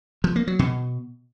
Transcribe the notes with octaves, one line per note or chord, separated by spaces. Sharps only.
F3
A#3
F#3
B2